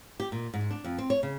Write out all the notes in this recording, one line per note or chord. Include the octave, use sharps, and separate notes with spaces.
G4
A#2
G#2
D4
F2
C4
C#5
C#3